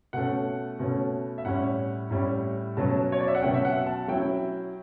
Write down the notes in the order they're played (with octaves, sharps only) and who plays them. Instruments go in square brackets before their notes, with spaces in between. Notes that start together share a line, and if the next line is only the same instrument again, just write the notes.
[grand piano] B2 A3 C#4 F#5
B2 A3 C#4
E5
A2 G3 C#4 F#5
A2 G3 C#4
B2 F#3 C#4 A5
C#5
D5
E5
F#5
B2 F#3 C#4 G5
E5
F#5
A5
F#3 C#4 E4 G5